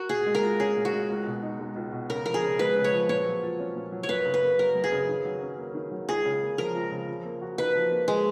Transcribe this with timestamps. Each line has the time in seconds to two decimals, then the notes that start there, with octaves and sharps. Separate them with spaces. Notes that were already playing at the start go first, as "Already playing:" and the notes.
Already playing: F#4 A#4
0.09 A#2 G#4
0.26 G#3
0.35 A#4
0.43 F4
0.60 C#4 G#4
0.76 A#2
0.85 F#4
0.93 G#3
1.10 C#2
1.26 B2
1.43 D#4
1.59 G#3
1.76 C#2
1.92 B2
2.10 C#3 A#4
2.26 F3 A#4
2.34 G#4
2.43 C#3
2.59 G#3 B4
2.76 C#3
2.84 C#5
2.93 F3
3.09 A#2 C#5
3.26 F#3
3.42 F4
3.59 C#4
3.75 A#2
3.92 F#3
4.03 C#5
4.09 F#2 B4
4.26 C#3
4.34 B4
4.42 A#3
4.58 F#3 A#4
4.75 F#2
4.84 G#4
4.92 C#3
5.09 D#3
5.25 F#3
5.42 C#4
5.58 A#3
5.75 D#3
5.92 F#3
6.08 C#2 G#4
6.25 C#3
6.42 A#3
6.58 F3 A#4
6.75 C#2
6.91 C#3
7.08 F3
7.25 A#3
7.42 F#4
7.58 D#4 B4
7.75 F3
7.91 A#3
8.08 G#3